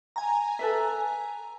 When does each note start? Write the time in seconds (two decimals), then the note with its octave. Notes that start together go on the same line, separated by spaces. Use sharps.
0.16 G#5 A#5
0.59 A4 B4 E5